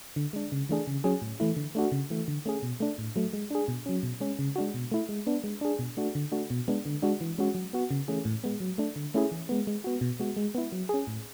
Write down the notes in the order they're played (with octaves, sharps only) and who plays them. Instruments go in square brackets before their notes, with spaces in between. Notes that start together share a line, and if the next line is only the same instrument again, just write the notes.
[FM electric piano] D3
G#3 D4
C#3
E3 A3 D4 G#4
C#3
F#3 C#4 G#4
A2
E3 A3 E4
D3
A3 D4 F#4
C#3
E3 A3
D3
A3 C#4 G#4
B2
A3 D4
A2
F#3 A3
G#3
D4 G#4
B2
F#3 C#4
B2
G#3 C#4
C#3
G#3 D4 F#4
B2
A3 E4
G#3
B3 D4
G#3
D4 G#4
B2
A3 D4 F#4
D3
A3 D4 F#4
B2
G#3 B3 D4
D3
G#3 D4 F#4
E3
G#3 C#4 F#4
F#3
B3 F#4
C#3
E3 A3 C#4 G#4
A2
G#3 B3
F#3
A3 D4
D3
A3 C#4 E4 G#4
E3
G#3 B3
G#3
B3 F#4
B2
G#3 B3 F#4
G#3
B3 E4
F#3
C#4 G#4
A2